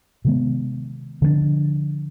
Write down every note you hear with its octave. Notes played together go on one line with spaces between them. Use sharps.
C3 D#3 G#3 B3
D3 F3 A#3 D4